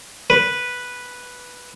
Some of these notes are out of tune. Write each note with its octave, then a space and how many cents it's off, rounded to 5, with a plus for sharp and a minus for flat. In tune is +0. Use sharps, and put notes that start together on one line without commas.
B4 -5